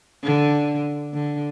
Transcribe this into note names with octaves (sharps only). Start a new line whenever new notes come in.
D3
D3